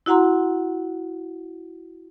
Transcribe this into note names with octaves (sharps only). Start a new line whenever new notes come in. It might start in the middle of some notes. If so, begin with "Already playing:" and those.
E4 F#4 F#5 A#5 C6